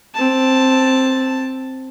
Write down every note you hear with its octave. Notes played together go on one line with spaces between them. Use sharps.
C4 A5